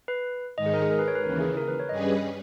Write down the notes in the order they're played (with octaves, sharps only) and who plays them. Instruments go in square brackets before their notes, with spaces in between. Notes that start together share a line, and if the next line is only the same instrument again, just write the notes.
[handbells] B4
[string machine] G#2 D#3 G#3 D#4 [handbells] D#5
[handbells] G#4
A#4
G#4
A#4
B4
C#5
B4
[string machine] D#2 C#3 E3 [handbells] A#4
[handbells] G#4
A#4
B4
C#5
[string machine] G2 G3 C#4 G#4 B4 [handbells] D#5